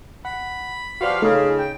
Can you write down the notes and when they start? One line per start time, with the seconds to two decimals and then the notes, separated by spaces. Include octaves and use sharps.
0.25 F#5 B5
1.01 F3 F#4 G4 B4 D5 F5 C#6
1.22 C#3 A3 D#4 F4 G#4 A4
1.58 G5